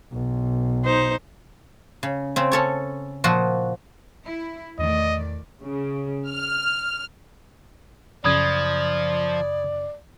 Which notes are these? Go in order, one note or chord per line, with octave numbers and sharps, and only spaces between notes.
B1
D#4 C5
C#3
C#3 C4
C#4 A4 C#5
A#2 F3 F#4
E4
E2 A2 D#3 D5 D#5
C#3
F6
F#2 C#3 F3 D5 B5 D#6 G#6